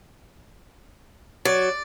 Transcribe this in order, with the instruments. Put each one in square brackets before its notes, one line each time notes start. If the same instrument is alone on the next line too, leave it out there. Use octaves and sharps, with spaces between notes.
[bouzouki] F#3 [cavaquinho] D5